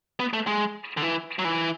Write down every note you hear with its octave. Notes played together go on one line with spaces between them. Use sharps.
B3
A3
G#3
D3
E3
F#3
E3